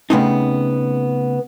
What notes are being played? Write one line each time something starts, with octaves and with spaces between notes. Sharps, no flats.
C#3 A3 B3 C4 D#4